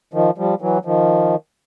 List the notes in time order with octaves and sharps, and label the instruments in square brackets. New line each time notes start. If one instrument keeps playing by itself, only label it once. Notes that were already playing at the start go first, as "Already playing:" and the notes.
[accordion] D#3 F3
F3 G3
E3 F#3
D#3 F3